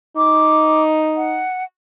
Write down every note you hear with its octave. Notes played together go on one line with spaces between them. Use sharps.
D#4 D6
F#5